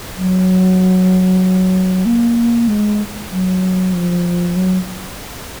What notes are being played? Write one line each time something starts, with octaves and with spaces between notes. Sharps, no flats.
F#3
A#3
G#3
F#3
F3
F#3